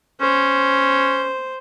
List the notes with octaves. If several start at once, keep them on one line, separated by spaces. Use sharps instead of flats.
C#4 C5